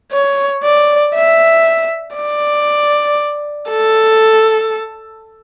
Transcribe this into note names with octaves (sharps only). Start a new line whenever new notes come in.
C#5
D5
E5
D5
A4